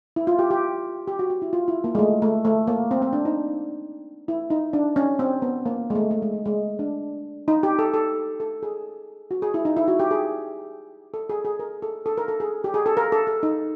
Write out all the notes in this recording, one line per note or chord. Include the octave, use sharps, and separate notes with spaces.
E4
F4
G4
G4
G4
F#4
F#4
E4
F4
E4
A#3
G#3
A3
A3
A3
A#3
C4
C4
D4
D#4
E4
D#4
D4
C#4
C4
B3
A#3
G#3
A3
A3
G#3
A3
G#3
D4
D#4
G4
A4
A4
A4
G#4
F#4
G#4
E4
D#4
E4
F#4
G4
G#4
A4
G#4
G#4
A#4
A4
A4
A#4
A4
G#4
G4
G#4
A4
A#4
A4
A4
D#4